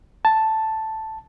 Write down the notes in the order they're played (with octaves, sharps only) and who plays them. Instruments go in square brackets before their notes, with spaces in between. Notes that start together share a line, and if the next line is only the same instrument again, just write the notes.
[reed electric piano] A5